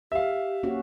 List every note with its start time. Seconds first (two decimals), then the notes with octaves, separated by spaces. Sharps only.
0.12 G4 E5 F5
0.63 A#3 C#4 F#4